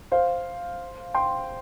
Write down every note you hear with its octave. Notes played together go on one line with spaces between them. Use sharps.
C5 F5
G5 C6